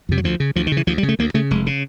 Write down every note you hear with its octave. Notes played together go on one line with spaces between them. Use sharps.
F2 C3
F#3
D2 F3
C#3
D2 F3
D#3
C#3 E3
D2 F3
G3
C#3
A3
D2 A#3
C#3 A3
F1 G#3
C#3